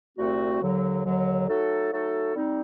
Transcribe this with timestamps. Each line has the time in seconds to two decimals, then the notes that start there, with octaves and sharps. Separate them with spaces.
0.18 C2 A#2 A3 C4 F#4
0.61 D#2 D3 F#3
1.05 D#2 D3 F#3
1.48 F#3 A3 D#4 F#4 A4
1.91 F#3 A3 D#4 F#4 A4
2.35 G3 C4 D#4